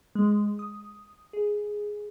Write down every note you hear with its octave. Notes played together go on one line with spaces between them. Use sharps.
G#3
D#6
G#4